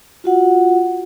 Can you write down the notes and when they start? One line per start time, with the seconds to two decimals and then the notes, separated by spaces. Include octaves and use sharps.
0.24 F4 F#4 F#5